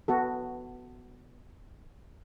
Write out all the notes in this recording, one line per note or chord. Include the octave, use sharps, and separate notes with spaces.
B3 F#4 A4